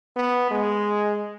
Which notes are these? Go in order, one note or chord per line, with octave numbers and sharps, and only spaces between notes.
B3
G#3